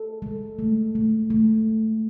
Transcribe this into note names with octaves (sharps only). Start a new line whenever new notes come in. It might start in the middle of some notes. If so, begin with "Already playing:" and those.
Already playing: A4
G#3
A3
A3
A3